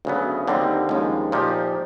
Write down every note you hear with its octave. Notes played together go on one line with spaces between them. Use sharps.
D2 C#3 F#3 B3
D#2 D3 G3 C4 D#4
D#2 C#3 F3 G#3 C#4
A#2 F3 A#3 D#4 G4